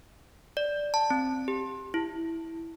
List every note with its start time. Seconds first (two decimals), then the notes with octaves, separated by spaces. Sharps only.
0.57 D5
0.94 A5
1.10 C4
1.48 G4
1.94 E4